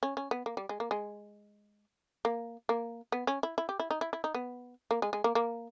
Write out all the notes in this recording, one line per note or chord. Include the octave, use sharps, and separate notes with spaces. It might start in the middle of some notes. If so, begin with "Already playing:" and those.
C#4
C#4
B3
A#3
G3
G#3
A#3
G#3
A#3
A#3
B3
C#4
E4
E4
G4
E4
D#4
E4
E4
D#4
B3
A#3
G#3
G#3
A#3
A#3